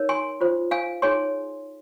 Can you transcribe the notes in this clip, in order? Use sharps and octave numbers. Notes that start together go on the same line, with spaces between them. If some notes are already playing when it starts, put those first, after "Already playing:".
Already playing: D#4 A#4 C#5
G#5 C6
F4 C5
F5 G#5
D#4 G#4 C#5 G#5 C6